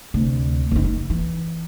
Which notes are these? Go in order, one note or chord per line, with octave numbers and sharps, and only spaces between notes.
D2 C3
F#1 D#3
D#3
E3